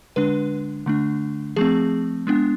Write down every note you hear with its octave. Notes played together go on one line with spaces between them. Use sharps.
D3 G#3 D4 B4
D3 A3 D4
F3 A3 C4 G#4
G#3 B3 D4